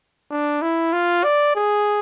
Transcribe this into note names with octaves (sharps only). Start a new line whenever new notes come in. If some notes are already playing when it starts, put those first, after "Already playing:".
D4
E4
F4
D5
G#4